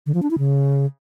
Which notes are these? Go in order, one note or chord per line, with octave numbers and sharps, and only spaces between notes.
D3
F3
D4
E4
C#3